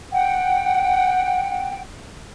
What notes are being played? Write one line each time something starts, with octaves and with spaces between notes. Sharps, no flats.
F#5 G5